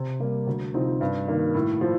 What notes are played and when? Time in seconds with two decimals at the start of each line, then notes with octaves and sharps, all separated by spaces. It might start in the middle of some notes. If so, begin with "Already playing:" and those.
Already playing: C3
0.20 G3 A#3
0.47 D2
0.74 C3 F3 C4 D#4
1.01 G2
1.28 D#3 A#3
1.54 A2
1.81 F3